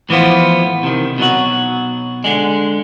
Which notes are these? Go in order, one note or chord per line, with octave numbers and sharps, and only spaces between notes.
A2 E3 F3 B3 F4
C3 D#3
B2 F#3 D#4 F#4
D3 G#3